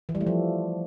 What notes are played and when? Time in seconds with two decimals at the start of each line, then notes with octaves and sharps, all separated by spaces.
0.09 E3
0.15 G3
0.21 A3
0.27 F3